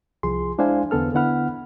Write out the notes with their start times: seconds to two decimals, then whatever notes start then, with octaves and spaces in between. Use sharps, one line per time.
0.23 C2 F3 G#4 C6
0.58 G#3 D4 E4 C5 F5 G#5
0.91 E2 D3 B3 A4 F6
1.14 D3 B3 E4 F#5 B5 F6